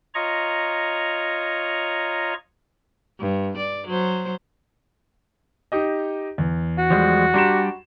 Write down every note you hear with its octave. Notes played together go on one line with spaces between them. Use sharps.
F4 C#5 D#5 A#5 C#6
G2
D5
F#3 C5
D#4 G4 D#5
E2
F#4
F3 G3 G#3
G3 D4 G4 A#5 C6 E7